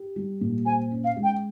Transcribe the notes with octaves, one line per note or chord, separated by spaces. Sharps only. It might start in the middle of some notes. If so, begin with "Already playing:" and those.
Already playing: G4
G3
A#2
C5 G#5
C#4
F5
G#3
G5